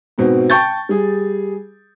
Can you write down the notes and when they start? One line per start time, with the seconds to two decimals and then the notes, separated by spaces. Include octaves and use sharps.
0.18 G#2 B2 C4
0.50 G5 A5 C#6 G6 A6
0.89 G3 G#4